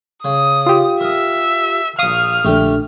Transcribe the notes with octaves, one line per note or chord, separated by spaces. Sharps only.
C#3 D#6
F4 G4
A#4 E5 D#6
A#1 F5 C#6 D#6 F6
A#1 D3 A3 G4